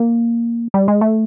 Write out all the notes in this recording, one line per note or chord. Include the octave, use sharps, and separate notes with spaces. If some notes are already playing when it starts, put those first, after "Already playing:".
Already playing: A#3
G3
G#3
A3